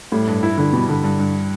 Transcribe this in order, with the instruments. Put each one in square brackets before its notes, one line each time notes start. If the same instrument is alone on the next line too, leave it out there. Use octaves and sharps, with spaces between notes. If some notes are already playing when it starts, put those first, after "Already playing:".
[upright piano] A2 [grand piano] G3
[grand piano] G2
E4
[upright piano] D3 [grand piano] E4
[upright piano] B2 [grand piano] G3
[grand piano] G2 [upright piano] D3
[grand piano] G2
G2